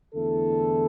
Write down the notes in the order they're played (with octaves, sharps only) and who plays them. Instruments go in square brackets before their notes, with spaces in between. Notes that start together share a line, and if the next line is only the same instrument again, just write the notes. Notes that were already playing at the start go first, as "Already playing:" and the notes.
[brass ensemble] E2 D3 A3 E4 A4